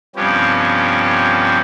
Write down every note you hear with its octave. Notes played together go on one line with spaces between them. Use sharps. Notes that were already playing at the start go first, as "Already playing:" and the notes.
G2 C3 F3 B3 C#4 G4